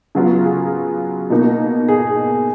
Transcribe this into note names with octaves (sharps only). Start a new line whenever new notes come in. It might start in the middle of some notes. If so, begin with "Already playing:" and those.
C#3 F#3 B3 F4 F#4
G#4
B2 A#3 D#4
G#4